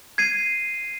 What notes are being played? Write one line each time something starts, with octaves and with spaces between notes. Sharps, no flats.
G#6 C7 D#7